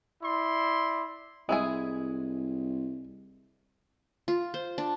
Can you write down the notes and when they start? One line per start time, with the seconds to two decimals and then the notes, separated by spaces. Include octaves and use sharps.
0.22 E4 D5 C6
1.49 C2 G#3 E4 G#4
4.28 F4
4.54 C5
4.78 D4